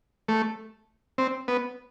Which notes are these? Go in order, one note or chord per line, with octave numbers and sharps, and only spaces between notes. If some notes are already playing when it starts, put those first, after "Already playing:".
A3
C4
B3